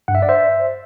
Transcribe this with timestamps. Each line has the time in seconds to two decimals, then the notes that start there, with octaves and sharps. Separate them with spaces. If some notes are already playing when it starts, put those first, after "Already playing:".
0.08 G2 F#5
0.15 E5
0.22 D5
0.29 C5 E5